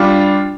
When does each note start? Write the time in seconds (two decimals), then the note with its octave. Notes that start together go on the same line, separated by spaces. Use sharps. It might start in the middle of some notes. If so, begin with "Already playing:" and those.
Already playing: G3 D4 F4